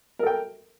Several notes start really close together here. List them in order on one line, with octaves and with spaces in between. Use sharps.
A#4 A4 G5